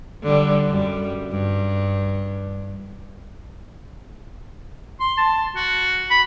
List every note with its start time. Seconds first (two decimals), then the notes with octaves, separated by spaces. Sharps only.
0.23 D3 G3
0.69 F#2 G3
1.31 G2
5.00 C6
5.17 A5
5.56 F#4
6.11 B5